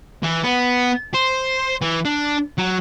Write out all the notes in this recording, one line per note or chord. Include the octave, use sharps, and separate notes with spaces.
E3
B3
C5
E3
D4
F#3